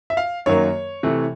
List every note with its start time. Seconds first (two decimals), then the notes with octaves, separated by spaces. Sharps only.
0.10 E5
0.17 F5
0.46 F#2 D#3 F#3 A#3 C#5
1.03 C3 E3 A3